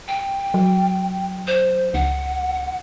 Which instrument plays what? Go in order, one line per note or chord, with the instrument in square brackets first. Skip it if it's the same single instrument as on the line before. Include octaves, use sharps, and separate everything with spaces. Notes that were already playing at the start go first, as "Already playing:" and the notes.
[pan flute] G5
[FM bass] F#3
[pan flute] C5
[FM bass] C#2 [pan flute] F#5